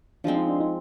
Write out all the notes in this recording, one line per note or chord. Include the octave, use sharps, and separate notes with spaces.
F3 G#3 C4 D4
D#4
D4
D#4